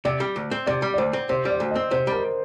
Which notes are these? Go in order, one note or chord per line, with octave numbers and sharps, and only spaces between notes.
C3 D5
G3
D2
C4
C3 D5
G3
D5
D2 C5
C4
C3 C5
G3 D5
D2
C4 D#5
C3 C5
G3 A#4